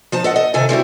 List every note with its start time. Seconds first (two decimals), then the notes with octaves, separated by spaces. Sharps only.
0.12 F3 D#4 A5
0.24 A4 D#5 F#5
0.36 D#5
0.54 C3 D#3 A4 G#5
0.69 G3 C4 E4 F#4